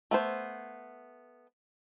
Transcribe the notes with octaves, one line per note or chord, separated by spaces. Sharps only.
A3 B3 C5